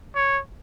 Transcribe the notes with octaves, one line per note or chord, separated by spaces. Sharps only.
C#5